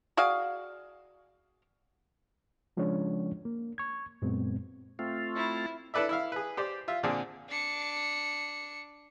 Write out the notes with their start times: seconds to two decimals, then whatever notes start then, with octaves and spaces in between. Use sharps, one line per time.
0.17 F#4 G#4 D5 F5
2.77 C#3 F3 G#3 C#4 D4 C#5
3.45 A#3
3.78 C#6 G#6
4.22 F#2 A#2 G#3 B3 C4
4.99 A3 C4 F4
5.35 E4
5.94 D4 E4 A4 B4 D5 E5
6.09 E4 E5 F5
6.32 G#4 B4
6.57 G4 C5 D5
6.88 F4 E5
7.03 A#2 D3 C4 D4 G#4
7.50 D4 C#7